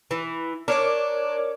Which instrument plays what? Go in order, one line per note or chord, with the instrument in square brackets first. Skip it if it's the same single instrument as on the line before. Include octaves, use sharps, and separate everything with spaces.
[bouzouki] E3
[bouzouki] D4 [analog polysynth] A#4 C#5 D6